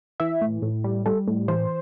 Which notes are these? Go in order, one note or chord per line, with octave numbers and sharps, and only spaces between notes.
E3 E5
A2
A2
G3
G3 A4
A2
E3 C5